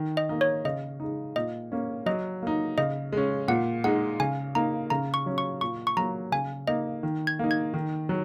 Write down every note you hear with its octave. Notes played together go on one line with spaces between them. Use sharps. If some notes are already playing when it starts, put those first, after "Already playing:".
Already playing: D#3
D#5
A#3 D#4
C#5
C#3 D#5
G#3 D#4
A#2 D#5
A#3 C#4
F#3 D#5
A#3 D#4
C#3 D#5
G#3 C#4
A#2 F#5
G#3 D#4 F#5
C#3 G#5
A#3 D#4 A#5
C#3 A#5
C#6
F#3 C#4
C#6
A#2 C#6
C#6
F#3 A#3 A#5
C#3 G#5
A#3 D#4 D#5
D#3
G#6
A#3 D#4
G#6
D#3
F#3